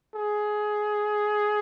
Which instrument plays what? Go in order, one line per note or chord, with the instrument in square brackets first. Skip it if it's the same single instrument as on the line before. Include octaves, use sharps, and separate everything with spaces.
[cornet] G#4